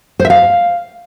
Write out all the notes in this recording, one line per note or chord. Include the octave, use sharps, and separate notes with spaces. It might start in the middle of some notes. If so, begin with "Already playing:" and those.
C5
E5
F5